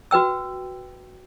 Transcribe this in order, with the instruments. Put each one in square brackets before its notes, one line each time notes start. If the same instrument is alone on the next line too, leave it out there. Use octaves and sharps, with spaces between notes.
[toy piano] F#4 B4 G5 E6